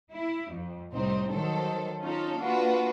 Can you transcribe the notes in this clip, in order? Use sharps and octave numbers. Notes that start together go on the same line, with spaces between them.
E4
F2
C2 A2 C4 D#4
D#3 F#3 A4 C5
C#4 D#4 F4 A4
A#3 D4 F4 F#4 B4